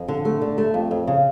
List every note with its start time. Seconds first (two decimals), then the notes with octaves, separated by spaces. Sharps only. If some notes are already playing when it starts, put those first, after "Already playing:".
Already playing: F2
0.08 D3
0.25 A3
0.42 D3
0.58 A3
0.74 F2
0.91 F2
1.07 C#3